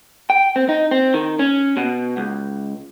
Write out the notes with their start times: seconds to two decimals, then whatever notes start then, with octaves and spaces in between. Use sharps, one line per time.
0.30 G5
0.56 C4
0.69 D#4
0.91 C4
1.14 D#3
1.39 C#4
1.77 B2
2.17 C#2